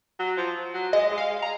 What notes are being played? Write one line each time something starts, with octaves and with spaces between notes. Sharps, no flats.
F#3
F3
F#3
G#3 D#5
G#3
F5
G#3
A#5